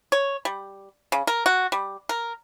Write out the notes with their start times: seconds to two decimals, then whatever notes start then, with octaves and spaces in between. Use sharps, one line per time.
0.12 C#5
0.45 G3
1.12 C#3
1.27 A#4
1.46 F#4
1.72 G3
2.09 A#4